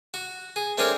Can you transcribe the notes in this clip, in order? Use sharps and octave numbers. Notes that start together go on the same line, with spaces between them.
F#4
G#4
A3 C4 D4 G#4 A#4 C#5